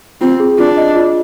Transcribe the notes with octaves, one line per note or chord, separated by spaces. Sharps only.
C4 F4
G#4
D4 F4
D#5
F4